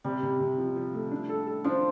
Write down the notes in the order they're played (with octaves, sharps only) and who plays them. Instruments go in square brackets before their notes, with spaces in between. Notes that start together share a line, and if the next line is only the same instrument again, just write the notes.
[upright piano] C3 [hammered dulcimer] G3
[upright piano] C3
C3
F3
F3
A3
D4
A4
A4
[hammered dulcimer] F3 [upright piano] D4